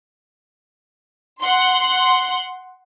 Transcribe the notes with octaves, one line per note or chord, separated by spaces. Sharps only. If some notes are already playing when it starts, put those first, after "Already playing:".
F#5 C6